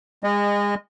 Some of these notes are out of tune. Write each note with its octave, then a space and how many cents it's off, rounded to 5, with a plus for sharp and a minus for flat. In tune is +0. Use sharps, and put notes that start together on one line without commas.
G#3 -30 D#5 -20